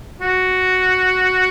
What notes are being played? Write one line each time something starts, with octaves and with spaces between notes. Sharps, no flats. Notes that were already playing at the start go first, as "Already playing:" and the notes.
F#4